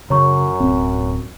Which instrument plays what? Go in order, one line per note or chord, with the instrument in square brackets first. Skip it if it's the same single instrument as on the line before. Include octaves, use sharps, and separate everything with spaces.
[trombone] F#2 [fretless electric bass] C#3 [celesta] C#5 A#5 C#6
[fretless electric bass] D1 C4